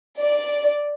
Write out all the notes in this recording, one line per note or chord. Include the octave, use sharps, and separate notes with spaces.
D5